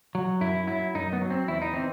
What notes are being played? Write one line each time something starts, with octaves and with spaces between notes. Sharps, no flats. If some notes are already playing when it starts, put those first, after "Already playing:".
F#3
F#2 E4
F#3 E4
F#2 D#4
B3
F#3
C4
E2 E4
D#4
E3 C4